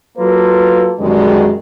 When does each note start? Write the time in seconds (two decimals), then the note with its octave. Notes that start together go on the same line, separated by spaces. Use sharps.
0.18 F#3 A#3 F4 A4 B4
0.99 F#2 B2 D3 D#3 G3 G#3